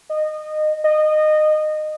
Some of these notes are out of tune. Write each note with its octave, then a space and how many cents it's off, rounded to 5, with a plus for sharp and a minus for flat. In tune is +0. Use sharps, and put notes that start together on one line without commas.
D#5 -20
D#5 -20